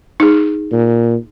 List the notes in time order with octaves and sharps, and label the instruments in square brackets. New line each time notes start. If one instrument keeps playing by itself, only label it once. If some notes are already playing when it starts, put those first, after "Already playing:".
[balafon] D#4 G#4
[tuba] A#2